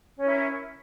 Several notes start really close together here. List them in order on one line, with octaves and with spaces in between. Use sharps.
C#4 A#4 E4